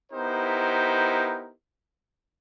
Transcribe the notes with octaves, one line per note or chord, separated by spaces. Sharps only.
B3 D#4 E4 G4 A#4 C5